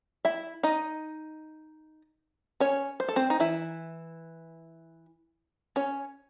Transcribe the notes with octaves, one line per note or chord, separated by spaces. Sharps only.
E4 E5
D#4 D#5
C#4 C#5
C5
A4
C4 C5
D#4
E3 E4
C#4 C#5